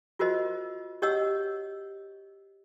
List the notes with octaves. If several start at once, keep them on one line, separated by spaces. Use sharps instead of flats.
F4 F#4 A#4 C5 D#5
G4 C#5 D#5 F#5 E6